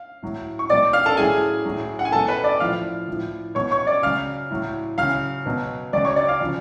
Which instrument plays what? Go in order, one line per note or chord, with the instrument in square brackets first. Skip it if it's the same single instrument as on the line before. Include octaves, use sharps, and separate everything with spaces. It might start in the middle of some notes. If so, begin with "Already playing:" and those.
Already playing: [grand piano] F5
A2 F#3
C#6
B2 F#3 D5 D6
F5 F6
A4 A5
A2 F#3 G#4 G#5
A2 F#3
F#5
G#5
B2 F#3 A4 A5
B4 B5
D5 D6
A2 F3 F5 F6
A2 F3
B2 F#3 C#5 C#6
C#5 C#6
D5 D6
C#3 F#3 F5 F6
A2 F#3
C#3 F#3 F5 F6
B2 F#3
C#3 F#3 D5 D6
C#5 C#6
D5 D6
F5 F6
C#3 F3